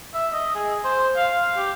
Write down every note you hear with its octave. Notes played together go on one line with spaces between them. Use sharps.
E5
D#5
G#4
C5
F5
G4